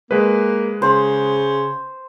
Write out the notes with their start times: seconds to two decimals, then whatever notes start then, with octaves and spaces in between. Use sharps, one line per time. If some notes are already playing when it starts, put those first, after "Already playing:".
0.11 G#3 A#3 B4
0.82 C#3 C5